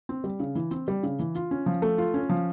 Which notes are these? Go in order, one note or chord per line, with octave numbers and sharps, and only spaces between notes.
C4
G3
C#3
E3
C4
G3
C#3
E3
F4
C#4
F3
A3
F4
C#4
F3